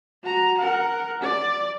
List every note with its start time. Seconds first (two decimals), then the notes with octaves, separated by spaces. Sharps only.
0.24 F#4 A#5
0.58 A#4 F#5
1.22 D5